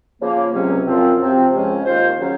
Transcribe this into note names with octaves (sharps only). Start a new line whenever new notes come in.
C#3 F3 A#3
C#2 C3 F#3 C#4
F#2 F3 C4 F4
C3 F3 C4
C#2 C#3 F3 G#3 C#4
D#2 D#3 A#3 F4 C5
C#3 F#3 C#4